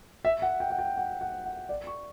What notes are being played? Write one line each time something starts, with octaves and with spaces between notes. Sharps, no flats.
E5
F#5
G5
F#5
G5
F#5
F#5
F#5
D5
C#6